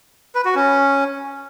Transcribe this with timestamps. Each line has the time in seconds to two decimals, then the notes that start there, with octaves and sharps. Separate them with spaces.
0.35 B4
0.45 F#4
0.55 C#4